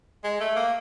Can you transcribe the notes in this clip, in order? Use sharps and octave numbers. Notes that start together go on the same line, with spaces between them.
G#3
A3
A#3